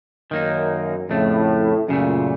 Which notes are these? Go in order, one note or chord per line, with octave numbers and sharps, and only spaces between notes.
F#2 D#3 A#3 D#4
F2 A2 C#3 A3
F#2 A#2 C#3 A3